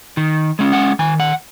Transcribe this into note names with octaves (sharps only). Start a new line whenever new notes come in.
D#3
G#3 C#4
F#5
D#3 G#5
F#5